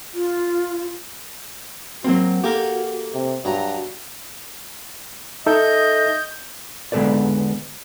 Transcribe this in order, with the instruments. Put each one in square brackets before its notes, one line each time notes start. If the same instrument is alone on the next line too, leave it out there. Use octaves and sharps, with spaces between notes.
[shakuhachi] F4
[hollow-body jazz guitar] F#3 A#3 C4 [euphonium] F#4
[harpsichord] A#3 A4 [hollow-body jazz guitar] G4 A#4
[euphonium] C3
[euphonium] G2 [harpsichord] F#3 A#5
[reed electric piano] D#4 A4 E5 [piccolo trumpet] D#5 [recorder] G6
[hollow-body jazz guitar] D3 G#3 B3 A4 B4 D5